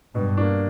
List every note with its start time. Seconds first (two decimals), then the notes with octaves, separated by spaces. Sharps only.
0.15 G2 B2
0.37 A#3 D4